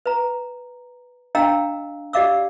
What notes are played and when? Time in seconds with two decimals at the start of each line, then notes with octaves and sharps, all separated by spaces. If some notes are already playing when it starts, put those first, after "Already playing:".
0.06 B4 A#5
1.35 D4 D#5 F5 G5 A#5 E6
2.13 G4 D5 D#5 F5 D6 E6